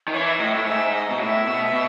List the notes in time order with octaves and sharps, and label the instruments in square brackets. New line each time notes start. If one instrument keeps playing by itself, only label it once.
[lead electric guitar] D#3
[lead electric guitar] E3 [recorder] C#5
[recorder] E5
[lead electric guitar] A2 [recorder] D#5
[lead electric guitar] A2 [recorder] E5
[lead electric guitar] G#2 [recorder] E5
[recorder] D#5
[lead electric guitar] B2
[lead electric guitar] A2 [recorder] E5
[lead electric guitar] B2
B2